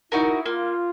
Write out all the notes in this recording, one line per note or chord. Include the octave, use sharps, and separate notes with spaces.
D#4 E4 F#4 A#4
A#3 F4